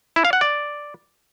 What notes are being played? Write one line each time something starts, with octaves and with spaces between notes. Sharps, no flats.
E4
F5
F#5
D5